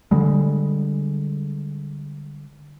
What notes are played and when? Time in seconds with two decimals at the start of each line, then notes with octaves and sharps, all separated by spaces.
0.11 D3 G3 G#3